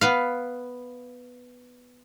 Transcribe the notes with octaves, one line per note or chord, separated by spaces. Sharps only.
B3 B4 F5